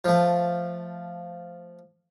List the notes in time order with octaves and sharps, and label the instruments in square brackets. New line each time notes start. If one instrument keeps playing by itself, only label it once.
[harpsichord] F3 A3